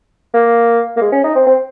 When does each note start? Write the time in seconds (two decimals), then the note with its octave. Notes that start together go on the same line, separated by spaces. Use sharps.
0.34 A#3
0.97 A#3
1.01 G#3
1.12 C#4
1.24 D#4
1.35 C4
1.47 C4